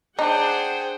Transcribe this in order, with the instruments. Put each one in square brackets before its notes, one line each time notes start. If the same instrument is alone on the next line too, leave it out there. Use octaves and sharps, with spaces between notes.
[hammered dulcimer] D4 [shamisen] D#4 [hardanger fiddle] G#4 C5 [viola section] F#5 G5